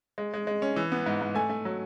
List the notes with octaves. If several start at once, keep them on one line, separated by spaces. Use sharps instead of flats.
G#3
G#3
G#3
C#4
E3
B3
G#2
G#2
A3 G#5
A3
F#3